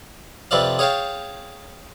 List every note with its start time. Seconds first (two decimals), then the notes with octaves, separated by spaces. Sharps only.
0.51 F2 C3 B4 D5 F5
0.79 G#4 C#5 F5 G5 A5